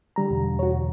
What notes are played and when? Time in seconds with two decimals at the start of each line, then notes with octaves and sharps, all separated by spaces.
0.16 D3 G3 A#5
0.31 E1
0.59 F#4 C#5
0.75 D2